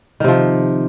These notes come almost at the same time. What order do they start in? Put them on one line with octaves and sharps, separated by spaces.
D#3 C3 F3